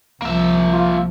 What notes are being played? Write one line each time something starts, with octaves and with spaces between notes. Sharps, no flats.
C2 F3 A#3 E5
F4